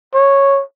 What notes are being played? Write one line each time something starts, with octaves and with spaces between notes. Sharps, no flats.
C#5